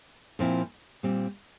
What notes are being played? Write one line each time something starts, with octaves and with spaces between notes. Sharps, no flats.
A#2 F3 C4 E4
A#2 G3 C4